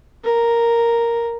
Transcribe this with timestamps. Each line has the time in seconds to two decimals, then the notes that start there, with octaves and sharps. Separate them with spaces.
0.24 A#4